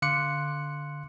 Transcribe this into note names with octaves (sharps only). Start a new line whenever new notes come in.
D3 F5 C6 D6 F#6 C#7